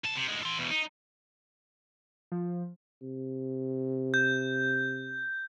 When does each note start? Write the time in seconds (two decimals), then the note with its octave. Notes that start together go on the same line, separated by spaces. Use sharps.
0.04 B1 A5
0.15 C3
0.28 D2 G#3
0.43 A4 C6
0.58 E2 B2
0.70 D#4
2.32 F3
3.02 C3
4.14 G6